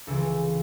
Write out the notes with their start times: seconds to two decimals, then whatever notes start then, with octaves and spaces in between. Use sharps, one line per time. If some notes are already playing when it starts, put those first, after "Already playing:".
0.07 C#2 C#3 E3 A4